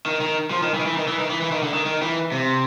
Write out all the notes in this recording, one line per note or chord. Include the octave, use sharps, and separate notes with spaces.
D#3
D#3
F3
D#3
E3
D#3
E3
D#3
E3
D#3
E3
E3
D#3
D3
D#3
D#3
E3
C3